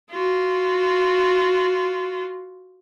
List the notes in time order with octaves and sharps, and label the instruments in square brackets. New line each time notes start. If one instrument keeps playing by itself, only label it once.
[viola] F4 F#4